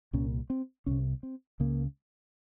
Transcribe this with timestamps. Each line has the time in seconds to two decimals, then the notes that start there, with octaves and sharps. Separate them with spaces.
0.13 C2 A#2 C#4
0.50 C4
0.86 C2 C3 C#4
1.23 C4
1.60 C#2 C#3 A#3